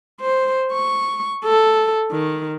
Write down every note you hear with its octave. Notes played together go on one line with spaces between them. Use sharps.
C5
C#6
A4
D#3